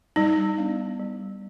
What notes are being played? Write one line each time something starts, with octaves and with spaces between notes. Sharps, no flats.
G3 D#4
B3 D4
G3